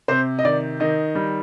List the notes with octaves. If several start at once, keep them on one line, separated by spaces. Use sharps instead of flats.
C3 C5
D#5
D#3 D5
D#3 D#5
G3